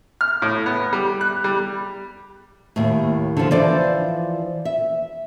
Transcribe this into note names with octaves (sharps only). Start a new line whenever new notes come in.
F6
A2
B3
G3
F#6
G3
D#2 A2
D3 F3
E3 F3 C5 D5
E5